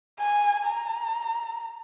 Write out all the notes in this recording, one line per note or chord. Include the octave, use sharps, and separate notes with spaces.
G#5
A#5